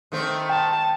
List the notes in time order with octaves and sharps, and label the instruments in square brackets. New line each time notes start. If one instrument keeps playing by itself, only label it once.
[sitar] D#3 A3 C4
[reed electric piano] G5 [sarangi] A5